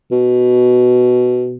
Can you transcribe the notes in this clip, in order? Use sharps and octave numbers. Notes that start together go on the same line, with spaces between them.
B2